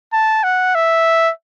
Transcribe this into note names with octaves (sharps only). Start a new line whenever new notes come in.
A5
F#5
E5